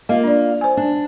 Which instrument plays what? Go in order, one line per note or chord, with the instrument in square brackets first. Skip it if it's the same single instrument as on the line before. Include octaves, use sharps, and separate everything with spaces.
[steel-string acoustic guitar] A#3 F4 [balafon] D#5
[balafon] D4 D5
C5 G#5
[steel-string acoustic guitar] D4